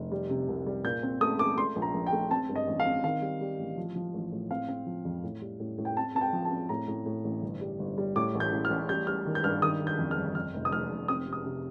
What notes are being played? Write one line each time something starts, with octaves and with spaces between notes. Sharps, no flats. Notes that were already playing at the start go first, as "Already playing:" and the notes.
Already playing: F1
G3
C3
C2
G3
A#2 G6
C4
A3 D#6
A3 D6
A3 C6
A#1
A#5
A#1
G5
A3
C4 A5
G2
D#5
A1
F5
C4
D#3 F5
G3
G3
A1
F3
F3
A1
A2
C4 F5
C4
F3
F2
A2
G3
A2
A2
G5
C4 A5
C4 A5
G5
F3
A5
C4
A2 A#5
A2
A2
A1
G1
G3
G1
G3
A2 D6
A1
G6
A2
F6
A1
G3 G6
G3 F6
D#3
G6
G2 F6
D#3 D#6
D#3
G6
F2
F6
G1
F2 F6
F1
D#6
F1 F6
F1
C4 D#6
C3
D#6
C3